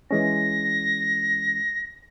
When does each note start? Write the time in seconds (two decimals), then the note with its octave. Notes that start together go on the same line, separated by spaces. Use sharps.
0.11 E3 G#3 C#4 A#6